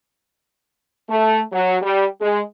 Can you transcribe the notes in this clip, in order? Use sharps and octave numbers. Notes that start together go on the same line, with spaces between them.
A3
F#3
G3
G#3